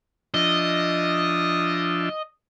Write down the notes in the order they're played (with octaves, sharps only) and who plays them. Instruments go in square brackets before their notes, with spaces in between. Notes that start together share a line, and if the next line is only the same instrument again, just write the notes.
[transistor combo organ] F3 D4 E5 [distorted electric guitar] D#5